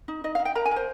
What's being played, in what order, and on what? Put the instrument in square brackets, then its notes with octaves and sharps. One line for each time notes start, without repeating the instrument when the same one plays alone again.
[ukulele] D#4
D#4 D#5
D#4 F5
G5
A#4 A#5
G#5
A#4
C5